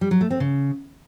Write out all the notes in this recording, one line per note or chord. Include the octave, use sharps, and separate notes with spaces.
G3
F#3
A3
C4
C#3